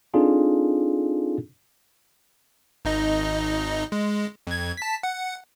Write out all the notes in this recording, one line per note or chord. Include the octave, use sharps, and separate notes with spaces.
C4 D4 D#4 F4 G#4 A4
G#1 D#4 D#5
G#3
F2 G#6
A5 B6
F#5